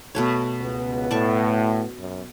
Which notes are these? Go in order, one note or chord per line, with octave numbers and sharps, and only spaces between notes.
B2 A3 C#5
C#2 B3
A2 D5 A5 C#6
F#2